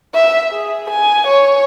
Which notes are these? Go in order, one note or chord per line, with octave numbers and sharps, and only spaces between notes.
E5
G#4
G#5
C#5